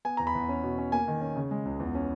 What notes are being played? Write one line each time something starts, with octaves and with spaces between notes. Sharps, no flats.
B3 G#5
E2 A#5
B5
E2
C#4
B2
C#4
A#3 G#5
D#3
C#4
C#3
G#3
C#2
E2
C#4